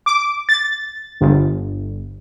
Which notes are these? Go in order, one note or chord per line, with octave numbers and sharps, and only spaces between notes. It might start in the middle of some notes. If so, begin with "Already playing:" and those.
D6
A6
G1